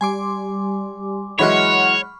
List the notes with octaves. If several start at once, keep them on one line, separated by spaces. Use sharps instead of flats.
G3 G#5 C6 D6
E3 F#3 G#3 C#5 F#5 B5 C#6 F6